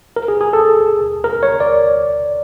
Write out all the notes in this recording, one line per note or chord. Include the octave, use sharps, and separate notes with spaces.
A#4
G#4
G#4
A4
A#4
C#5
D5